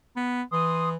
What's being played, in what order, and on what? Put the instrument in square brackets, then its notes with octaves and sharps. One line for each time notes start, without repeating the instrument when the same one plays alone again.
[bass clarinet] B3
[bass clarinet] E3 [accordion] C6 D#6